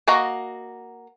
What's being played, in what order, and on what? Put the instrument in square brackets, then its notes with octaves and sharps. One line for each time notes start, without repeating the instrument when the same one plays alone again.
[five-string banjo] A#3 F#4 D#5 A#5